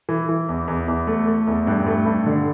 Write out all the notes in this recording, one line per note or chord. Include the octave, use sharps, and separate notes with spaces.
E3
E3
E2
E2
E2
A3
A3
E2
G2
A3
G2
D3